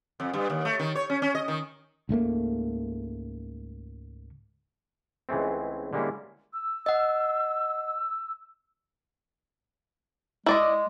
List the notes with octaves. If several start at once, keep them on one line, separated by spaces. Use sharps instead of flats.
F2
G2
D#2
A3
D#3
C#5
C#4
C#4
D#5
D#3
C#2 G#2 A3 A#3
C#2 E3 G#3 A3 C4
D3 G3 G#3 A#3 C#4 E4
E6
D#5 F#5
G#3 E4 D5 D#5